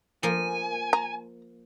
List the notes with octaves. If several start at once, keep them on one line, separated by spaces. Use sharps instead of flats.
F3 A#3 G#5
A#5